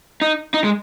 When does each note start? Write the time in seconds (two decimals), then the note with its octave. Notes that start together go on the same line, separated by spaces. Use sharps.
0.21 D#4
0.54 D#4
0.64 G#3